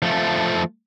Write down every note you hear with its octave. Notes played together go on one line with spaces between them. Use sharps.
F3 A3